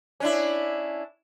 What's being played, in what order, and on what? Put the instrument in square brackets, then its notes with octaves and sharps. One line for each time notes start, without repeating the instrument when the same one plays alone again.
[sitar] C#4 D4 E4